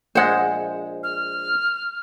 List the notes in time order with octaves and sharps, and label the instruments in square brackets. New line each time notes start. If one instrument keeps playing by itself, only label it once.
[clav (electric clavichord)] A#1 G#3 [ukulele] C5 F#5
[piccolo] F6